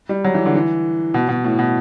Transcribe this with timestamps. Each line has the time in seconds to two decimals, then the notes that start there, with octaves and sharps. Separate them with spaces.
0.09 G3
0.24 F#3
0.34 E3
0.46 D3
0.56 E3
1.14 B2
1.29 B2
1.44 A2
1.59 B2